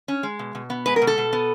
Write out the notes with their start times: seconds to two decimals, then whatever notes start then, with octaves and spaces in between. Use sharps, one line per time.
0.08 C#4
0.23 G#3
0.39 B2
0.55 B2
0.70 B3
0.86 G#3 B4
0.96 A#4
1.02 B2
1.07 A4
1.18 B2
1.33 B3